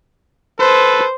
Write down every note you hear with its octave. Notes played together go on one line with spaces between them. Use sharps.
A4 B4 C5